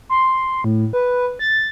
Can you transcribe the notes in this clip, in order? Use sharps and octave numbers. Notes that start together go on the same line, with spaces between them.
C6
A2
B4
A6